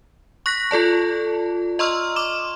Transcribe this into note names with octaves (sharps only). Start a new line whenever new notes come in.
C#6 F#6 A#6 B6
F4 A4 D5 A5
D#5 A#5 C6 C#6 E6 F6
C6 D6 E7